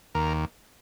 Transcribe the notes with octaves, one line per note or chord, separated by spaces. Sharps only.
D#2 A#4